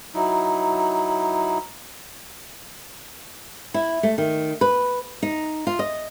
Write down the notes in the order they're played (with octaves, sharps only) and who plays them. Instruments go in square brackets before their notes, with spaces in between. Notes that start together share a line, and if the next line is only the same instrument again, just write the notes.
[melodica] F#3 D#4 E4
[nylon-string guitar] E4
A3
D#3
B4
D#4
F4
D#5